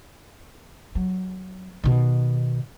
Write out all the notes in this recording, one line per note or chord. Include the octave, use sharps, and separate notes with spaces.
F#3
B2 D#3